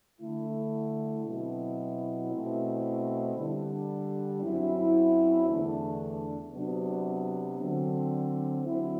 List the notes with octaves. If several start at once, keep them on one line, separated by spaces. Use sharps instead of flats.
D3 A3 E4
B2 F#3 C4 E4
B2 A3 C4 E4
D3 G3 D4
F#2 F#3 C4 E4
E2 D3 A3 D4
C3 F#3 B3 D4
D3 F#3 C4
D3 F#3 C4 E4